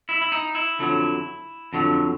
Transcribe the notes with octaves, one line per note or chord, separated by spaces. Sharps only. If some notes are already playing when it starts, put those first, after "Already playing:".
E4
E4
D#4
E4
F2 D3 F#3
F2 D3 F#3